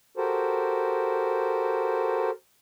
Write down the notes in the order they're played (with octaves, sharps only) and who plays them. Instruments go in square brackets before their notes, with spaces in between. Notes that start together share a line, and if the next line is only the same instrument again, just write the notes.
[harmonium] F#4 G4 A4 A#4 C5